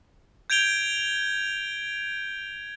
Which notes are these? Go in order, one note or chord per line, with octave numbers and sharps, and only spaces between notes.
G6 G#6 D7 F7 G7